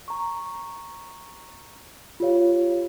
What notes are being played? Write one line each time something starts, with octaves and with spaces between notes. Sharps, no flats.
A#5 C#6
F4 G4 C#5 F5